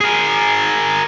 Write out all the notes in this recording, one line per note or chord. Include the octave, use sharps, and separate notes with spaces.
G#4 A#4